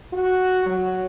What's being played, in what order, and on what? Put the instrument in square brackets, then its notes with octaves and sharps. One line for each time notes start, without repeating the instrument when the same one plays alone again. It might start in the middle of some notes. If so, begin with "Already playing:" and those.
[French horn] F#4
F#3